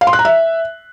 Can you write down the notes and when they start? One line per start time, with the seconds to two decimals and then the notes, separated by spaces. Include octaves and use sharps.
0.01 F5
0.07 C6
0.13 F#6
0.19 A#5
0.25 E5